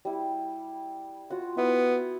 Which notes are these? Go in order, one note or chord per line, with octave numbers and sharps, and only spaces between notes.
G3 E4
F4 F#4 F#5
B3 E4